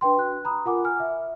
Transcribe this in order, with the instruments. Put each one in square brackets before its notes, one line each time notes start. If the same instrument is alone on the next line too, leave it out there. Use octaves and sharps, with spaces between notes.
[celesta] D4 B4 G5 C6
F#4 F#6
A#5 B5 D#6
F4 A#4 F#5 G#5 D6
G#5 F6
E5